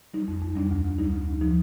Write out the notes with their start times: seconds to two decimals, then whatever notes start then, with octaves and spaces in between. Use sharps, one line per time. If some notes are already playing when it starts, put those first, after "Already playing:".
0.14 G3 D#4
0.28 F2
0.42 F2
0.56 G3 D4
0.71 D2
0.85 D2
0.98 G3 D#4
1.14 D2
1.28 D2
1.41 F3 D#4